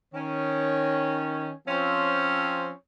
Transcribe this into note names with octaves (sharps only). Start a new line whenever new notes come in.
D#3 C#4
F3 C4 C#4